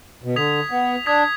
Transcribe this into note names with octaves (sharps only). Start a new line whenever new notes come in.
B2
D3 D#6 G#6 B6 F7
B3
D4 D#6 G#6 B6 F7